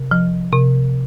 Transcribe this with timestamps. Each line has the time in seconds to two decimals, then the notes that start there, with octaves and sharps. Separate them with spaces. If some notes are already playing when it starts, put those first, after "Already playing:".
Already playing: C3
0.11 F3
0.52 C3